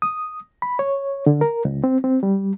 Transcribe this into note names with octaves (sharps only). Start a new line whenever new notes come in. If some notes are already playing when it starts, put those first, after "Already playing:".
D#6
B5
C#5
D3
A#4
C#2
C4
C4
G3